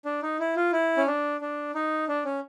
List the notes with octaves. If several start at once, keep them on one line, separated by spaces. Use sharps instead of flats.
D4
D#4
E4
F4
E4
C#4
D4
D4
D#4
D4
C#4